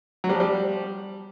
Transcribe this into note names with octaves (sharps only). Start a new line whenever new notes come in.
F#3
G3
F3
G3